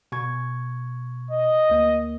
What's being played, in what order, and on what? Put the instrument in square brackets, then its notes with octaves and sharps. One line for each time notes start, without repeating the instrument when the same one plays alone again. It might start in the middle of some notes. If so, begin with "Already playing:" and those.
[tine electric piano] B2 C#6 G#6
[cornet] D#5
[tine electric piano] D2 A#3